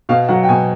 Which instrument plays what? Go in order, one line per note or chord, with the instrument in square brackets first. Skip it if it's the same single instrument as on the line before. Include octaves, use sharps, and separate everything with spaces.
[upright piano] B2 F5
F#3 F#5
G5
B2 G#5